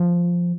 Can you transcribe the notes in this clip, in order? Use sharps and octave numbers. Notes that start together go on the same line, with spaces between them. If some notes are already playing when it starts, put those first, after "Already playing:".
Already playing: F3